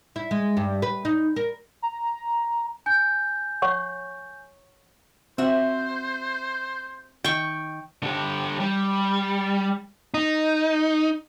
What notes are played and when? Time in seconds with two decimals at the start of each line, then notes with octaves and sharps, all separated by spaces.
0.16 E4
0.31 G#3
0.57 G2
0.82 B4
1.05 D#4
1.36 A#4
1.82 A#5
2.86 G#5 G6
3.62 C#5 F#5 C#6
5.38 C4 F#4 C5 E5
7.24 D#3 G5 C#6
8.03 D3 G4
8.60 G3
10.14 D#4